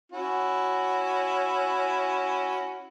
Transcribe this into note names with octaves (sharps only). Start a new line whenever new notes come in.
C#4 E4 F#4